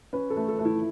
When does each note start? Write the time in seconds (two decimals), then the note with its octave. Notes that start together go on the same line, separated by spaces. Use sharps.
0.13 C#4 B4
0.30 A4
0.37 A3
0.48 A4
0.59 A3
0.65 E4